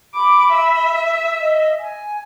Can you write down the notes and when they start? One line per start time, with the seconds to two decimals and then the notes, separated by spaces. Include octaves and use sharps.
0.14 B5 D6
0.52 E5
1.39 D#5
1.80 G#5